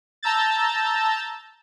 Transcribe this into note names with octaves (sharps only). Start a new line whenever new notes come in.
A5 A#5 E6 G6 A6